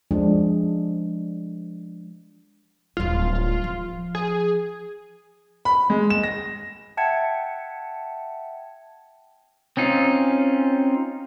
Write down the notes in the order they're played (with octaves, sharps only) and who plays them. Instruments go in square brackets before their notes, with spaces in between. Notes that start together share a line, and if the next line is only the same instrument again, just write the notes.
[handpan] F3 G#3 D4
[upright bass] D1 G3 [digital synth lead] F4
[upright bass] F3
[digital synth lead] G#4
[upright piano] B5
G#3
E7
A#6
[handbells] E5 F#5 G5 A5 G#6 C#7
[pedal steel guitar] C4 C#4 D#4 F4